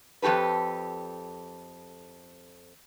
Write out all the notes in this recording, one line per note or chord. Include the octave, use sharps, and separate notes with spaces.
F2 A#2 G4 A4 B4